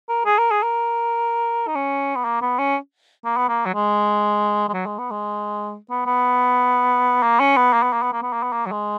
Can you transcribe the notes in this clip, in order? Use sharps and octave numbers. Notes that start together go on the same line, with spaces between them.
A#4
G#4
A#4
G#4
A#4
D#4
C#4
B3
A#3
B3
C#4
A#3
B3
A#3
F#3
G#3
G#3
F#3
G#3
B3
G#3
B3
B3
A#3
C#4
B3
A#3
B3
A#3
B3
A#3
B3
A#3
B3
A#3
F#3
G#3